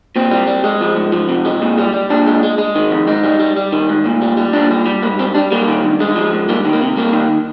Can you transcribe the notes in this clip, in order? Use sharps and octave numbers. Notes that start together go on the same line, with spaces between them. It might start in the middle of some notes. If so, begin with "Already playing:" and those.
A#2 C4
G3
G3
G#3
F3
G#2
F3
C3
G#3
A#2
G3
G3
A#2 D4
G#3
G#3
G#3
D#3
F2
G#2 D#4
G3
G3
G3
D#3
G#2
A#2
G3
G3
A#2 D4
G3
G3
G#2 A#3
G3 C4
G3 D4
G3 A#3
D#3
G2
G#3
F3
G#2
G3 A#3
D#3
A#3
C3
G3 A#3
D#3